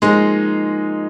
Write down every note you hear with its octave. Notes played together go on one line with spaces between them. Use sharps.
F3 G#3 A#3 D#4